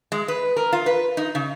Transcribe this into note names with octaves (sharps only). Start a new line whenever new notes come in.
G#3
B4
A#4
F4
B4
D#4
C#3